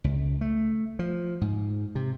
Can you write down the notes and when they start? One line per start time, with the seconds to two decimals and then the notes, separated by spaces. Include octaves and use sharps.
0.04 C#2
0.41 A3
0.99 F3
1.41 G#2
1.95 C3